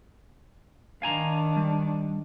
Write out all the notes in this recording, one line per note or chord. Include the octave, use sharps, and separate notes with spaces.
D#3 D4 F5 G#5 A#5
G3